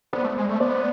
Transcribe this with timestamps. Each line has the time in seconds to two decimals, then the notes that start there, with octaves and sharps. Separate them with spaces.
0.13 B3 C5 D5
0.25 A3
0.37 G#3
0.49 A3
0.60 B3 C5 D5